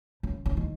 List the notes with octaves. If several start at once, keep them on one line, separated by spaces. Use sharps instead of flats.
C#3
C#3
D#3